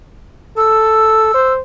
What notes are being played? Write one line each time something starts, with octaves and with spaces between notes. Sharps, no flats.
A4 E6
C5